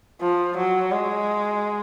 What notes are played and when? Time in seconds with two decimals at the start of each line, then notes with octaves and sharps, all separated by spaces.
0.21 F3
0.57 F#3
0.92 G#3